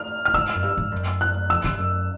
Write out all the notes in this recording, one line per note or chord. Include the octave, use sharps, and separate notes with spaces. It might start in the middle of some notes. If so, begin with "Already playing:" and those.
Already playing: F6
F6
G#2 E6
F#2
G2
G#2
F#2
F#6
F2 E6
G2
F#2